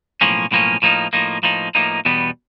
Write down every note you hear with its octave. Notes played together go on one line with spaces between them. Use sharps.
B1 A2 F3 A#3 C#4
B1 A2 F3 A#3 C#4
A2 F3 A#3 D#4
A2 F3 A#3 D#4
A2 F3 A#3 D#4
A2 F3 A#3 D#4
E2 B2 G3 B3